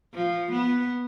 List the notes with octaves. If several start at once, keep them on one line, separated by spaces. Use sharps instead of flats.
F3
B3